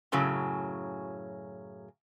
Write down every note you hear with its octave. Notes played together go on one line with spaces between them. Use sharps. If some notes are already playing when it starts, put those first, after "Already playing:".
F#2 A2 C#3 F#3